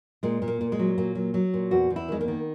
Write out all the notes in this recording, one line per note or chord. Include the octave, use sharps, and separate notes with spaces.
A#2 G#3
A#2
A#3
A#2
G#3
F#3
A#2 A#3
F#3
F#3
A#2
E2 F#4
E2
E4
D#3 G#3
A#3
D#3